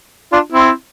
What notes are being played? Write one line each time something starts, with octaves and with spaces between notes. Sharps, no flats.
D4 F4
C4 E4